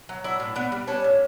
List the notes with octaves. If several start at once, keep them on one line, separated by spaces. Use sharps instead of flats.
F#3
D4 E4 E5
A2
B3 D4 D5
G3
C#4 D4 C#5
A2